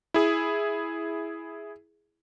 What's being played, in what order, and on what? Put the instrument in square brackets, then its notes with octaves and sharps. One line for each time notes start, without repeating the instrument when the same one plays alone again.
[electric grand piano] E4 G#4